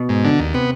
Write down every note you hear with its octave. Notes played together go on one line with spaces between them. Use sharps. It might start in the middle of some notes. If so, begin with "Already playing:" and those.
Already playing: B2
G#2
D3
D#2
C3 B3